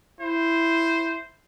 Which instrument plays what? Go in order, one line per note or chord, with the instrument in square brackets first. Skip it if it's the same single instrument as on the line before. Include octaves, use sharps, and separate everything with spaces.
[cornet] E4 [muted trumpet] C5